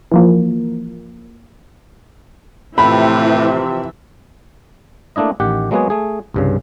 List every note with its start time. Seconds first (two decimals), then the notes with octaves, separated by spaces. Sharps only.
0.12 E3 F3 A#3
2.78 A2 C3 E3 F3 E5 B5
5.16 A3 A#3 D4 E4 D#5
5.40 A1 D#3 G4 F#5
5.71 F#3 G#3 A#3 B3 F#4 G#4
5.90 A3 G#4
6.34 C2 G2 C#3